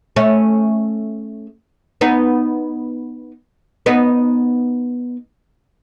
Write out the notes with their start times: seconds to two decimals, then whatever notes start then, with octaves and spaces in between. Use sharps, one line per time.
0.16 A3 C#4
2.01 B3 D#4
3.86 B3 D#4